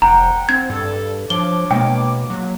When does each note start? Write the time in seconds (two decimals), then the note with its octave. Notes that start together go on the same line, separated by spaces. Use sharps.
0.02 F1 F#5 G5 A#5
0.49 C4 G#6
0.70 G2 A4
1.30 F3 D4 C#5 D6 G7
1.71 B2 G#3 A#3 G5
2.30 F#3